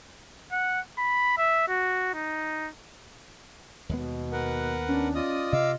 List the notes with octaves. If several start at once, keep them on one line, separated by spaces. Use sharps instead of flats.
F#5
B5
E5
F#4
D#4
D#2 B2 G#3 B3
A#4 B4 F#5
C#4 D4
F4 D5 D#5 D#6
C3 D#5 F5 D6 E6